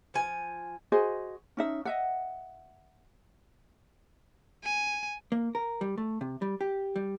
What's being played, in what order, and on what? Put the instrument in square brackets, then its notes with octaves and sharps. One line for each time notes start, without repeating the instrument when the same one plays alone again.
[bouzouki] F3 G#5
[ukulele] F#4 G#4 C5 D#5
C#4 D#4 E5
D#5 E5 F#5
[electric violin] G#5
[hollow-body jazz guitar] A#3
A#4
G3
A3
C3
G3
G4
G3